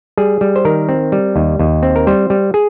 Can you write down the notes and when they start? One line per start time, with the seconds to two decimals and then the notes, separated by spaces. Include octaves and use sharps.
0.17 G3 G#4
0.41 G3
0.56 C5
0.65 D#3 A#4
0.89 C4
1.12 G3
1.36 D#2
1.59 D#2
1.83 C4
1.96 A#4
2.07 G3 C5
2.30 G3
2.54 G#4